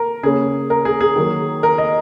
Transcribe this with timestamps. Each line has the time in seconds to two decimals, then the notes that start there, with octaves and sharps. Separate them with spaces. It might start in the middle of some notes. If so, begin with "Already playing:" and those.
Already playing: A#4
0.23 C#3 A#3 C#4 G#4
0.70 A#4
0.85 G#4
1.01 G#4
1.16 D#3 F#3 A#3
1.63 A#4
1.78 D#5